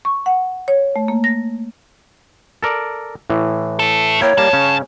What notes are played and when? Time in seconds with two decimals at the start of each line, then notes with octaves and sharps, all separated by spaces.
0.05 C#6
0.26 F#5
0.68 C#5
0.96 A3
1.08 A#3
1.24 A#6
2.63 A4 A#4 D5
3.30 A2 E3
3.79 E4 A4
4.22 A#3 E4 C#5 G5
4.38 G2 G3 A#3 A5
4.53 C#3 C#4